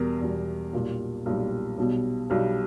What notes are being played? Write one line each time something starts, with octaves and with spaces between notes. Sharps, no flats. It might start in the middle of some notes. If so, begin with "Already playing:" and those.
Already playing: E2 B2 G3 A#4
E2 B2 G3
B1 A#2 G3
B1 A#2 G3
B1 B2 G3
B1 B2 G3